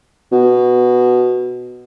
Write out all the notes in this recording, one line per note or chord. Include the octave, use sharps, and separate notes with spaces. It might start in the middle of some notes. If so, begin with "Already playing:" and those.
B2